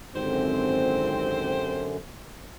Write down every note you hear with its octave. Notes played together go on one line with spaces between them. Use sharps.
G#1 F#2 D3 C4 G4 C5